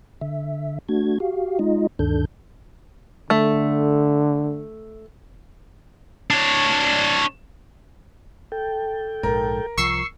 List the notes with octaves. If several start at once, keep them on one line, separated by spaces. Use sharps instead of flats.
D3 E5
A3 D4 F#4 G#6
F#4 G4 F5
G#3 D#4 F4 D#5
D2 G2 D#3 D4 A4 G6
D3 A3
D4 C#5
A4 G5
A#1 G#2 A#4
C2 F3 C#6 E6 C7